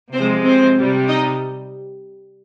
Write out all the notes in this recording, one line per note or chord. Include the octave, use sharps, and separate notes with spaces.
C3 F3 G#3 C4 C5
C4 C5
C3 G3
D#4 D#5